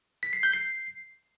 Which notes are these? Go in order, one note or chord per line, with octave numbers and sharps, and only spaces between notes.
B6
C7
G6
C7